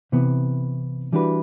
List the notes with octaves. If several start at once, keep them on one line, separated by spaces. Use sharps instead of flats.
C3 E3 B3
E3 G3 D4 F#4 B4